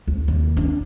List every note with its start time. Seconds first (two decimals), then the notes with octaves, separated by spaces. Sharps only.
0.07 D2
0.28 D#2
0.57 D4